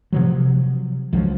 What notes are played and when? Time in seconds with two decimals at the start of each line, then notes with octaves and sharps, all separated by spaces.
0.12 C3 F3 F#3
1.13 C#2 F3 F#3